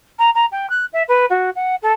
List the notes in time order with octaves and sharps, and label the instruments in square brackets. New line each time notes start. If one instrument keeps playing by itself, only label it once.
[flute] A#5
A#5
G5
F#6
E5
B4
F#4
F#5
A4